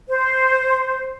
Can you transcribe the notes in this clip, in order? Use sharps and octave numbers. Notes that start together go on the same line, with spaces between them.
C5